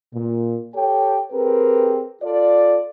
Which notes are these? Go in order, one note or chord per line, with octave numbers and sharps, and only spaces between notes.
A#2
G4 A4 C#5 G5
C4 G4 G#4 A#4 B4
F4 A4 D5